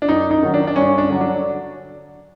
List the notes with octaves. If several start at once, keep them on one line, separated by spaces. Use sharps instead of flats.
D4
F#2 D#4
D#4
D#3 F#3
D4
D4
G2 C#4
D4
D3 F#3
D4